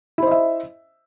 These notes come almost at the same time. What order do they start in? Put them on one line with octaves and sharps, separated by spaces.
E4 C5 D#5 E5